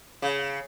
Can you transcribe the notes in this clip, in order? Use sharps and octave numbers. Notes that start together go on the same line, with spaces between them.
C#3